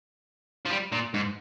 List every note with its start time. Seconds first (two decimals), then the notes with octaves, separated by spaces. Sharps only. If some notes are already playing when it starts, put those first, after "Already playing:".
0.66 F3
0.70 G3
0.92 A#2
1.14 G#2